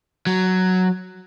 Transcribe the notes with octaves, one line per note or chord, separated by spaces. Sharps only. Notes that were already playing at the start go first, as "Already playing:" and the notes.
F#3